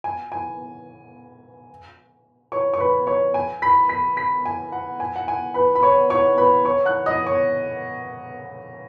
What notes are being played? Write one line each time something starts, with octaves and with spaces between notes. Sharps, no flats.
G#5
G#5
C#5 C#6
C#6
B4 B5
C#5 C#6
G#5
B5 B6
B5 B6
B5 B6
G#5
F#5
G#5
F#5
G#5
B4 B5
B5
C#5 C#6
C#5 C#6
B4 B5
C#5 C#6
F#5 F#6
D#5 D#6
C#5 C#6